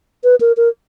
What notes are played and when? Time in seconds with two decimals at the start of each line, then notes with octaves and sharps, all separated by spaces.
0.24 B4
0.41 A#4
0.57 A#4